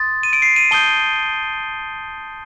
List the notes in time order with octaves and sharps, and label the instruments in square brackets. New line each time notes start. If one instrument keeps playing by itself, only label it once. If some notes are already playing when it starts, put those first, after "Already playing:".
Already playing: [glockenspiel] C6 D#6 A6
D#7
D7
C7
D#7
A5 D#6 G6 G7